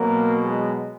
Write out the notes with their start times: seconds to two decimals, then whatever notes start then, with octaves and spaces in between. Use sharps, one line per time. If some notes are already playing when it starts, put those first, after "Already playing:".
Already playing: B2 F#3 A#3
0.44 G#3